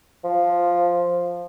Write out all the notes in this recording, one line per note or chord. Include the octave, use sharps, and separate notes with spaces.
F3